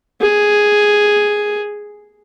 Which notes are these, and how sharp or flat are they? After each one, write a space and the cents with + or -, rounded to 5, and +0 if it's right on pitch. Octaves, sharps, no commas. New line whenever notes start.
G#4 +0